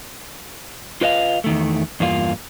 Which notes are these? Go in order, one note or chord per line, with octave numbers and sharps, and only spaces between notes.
F4 B4 D#5 F5
E2 D#3 A3
E2 G2 A#3 F4